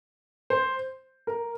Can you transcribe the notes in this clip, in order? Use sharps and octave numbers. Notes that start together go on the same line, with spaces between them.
C5
A#4